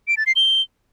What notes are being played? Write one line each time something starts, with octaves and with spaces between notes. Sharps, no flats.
D7
A6
C7
G7